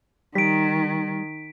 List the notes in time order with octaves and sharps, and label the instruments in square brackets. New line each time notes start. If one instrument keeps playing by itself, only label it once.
[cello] D#3 [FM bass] G3 [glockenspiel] B6 D7